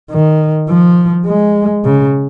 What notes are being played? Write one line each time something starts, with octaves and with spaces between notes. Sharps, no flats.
D#3
F3
G#3
C#3